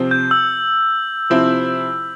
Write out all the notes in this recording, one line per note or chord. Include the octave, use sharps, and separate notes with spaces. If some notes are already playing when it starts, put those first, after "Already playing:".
Already playing: C3 F3 C4
G6
E6
C3 F3 C4 E4